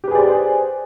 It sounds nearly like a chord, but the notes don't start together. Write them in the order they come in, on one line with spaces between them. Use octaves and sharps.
G4 B4 G#4 D5 C5